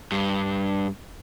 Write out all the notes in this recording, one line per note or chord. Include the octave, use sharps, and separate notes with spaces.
G2